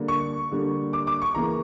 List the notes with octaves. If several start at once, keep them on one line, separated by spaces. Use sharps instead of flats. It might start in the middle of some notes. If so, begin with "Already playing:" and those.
Already playing: D3 G3 A#3
C#6
D3 G3 A#3
D6
D6
C#6
C#3 E3 A#3 A#5